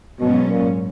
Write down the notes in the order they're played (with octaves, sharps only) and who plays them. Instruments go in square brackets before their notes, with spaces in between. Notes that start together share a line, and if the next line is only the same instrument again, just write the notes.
[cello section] G#2 F#3 C#4 [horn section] B2
[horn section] A#2